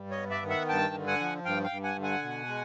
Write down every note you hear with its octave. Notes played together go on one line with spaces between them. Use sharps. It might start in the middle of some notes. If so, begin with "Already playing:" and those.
Already playing: G2 G3
C#5 D#5
B3
D5 E5
D#3
E5 F#5
G2 G5 A5
D3
F#5 G#5
F3
G2 F5 G5
F5 G5
G2
F#5 G#5
D3
F#5 G#5
B2
G#3